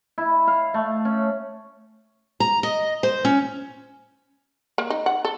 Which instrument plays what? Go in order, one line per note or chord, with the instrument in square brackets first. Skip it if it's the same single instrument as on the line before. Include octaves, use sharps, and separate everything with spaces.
[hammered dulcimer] E4
F5
A3
C#4
[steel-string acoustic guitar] A#5
D#5
C5
C#4
[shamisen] A#3
D#4
F#5
A4